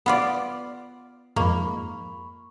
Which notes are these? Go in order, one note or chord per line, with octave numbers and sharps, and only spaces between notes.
B3 F4 D5
F2 G#2 A#3 B5 C#6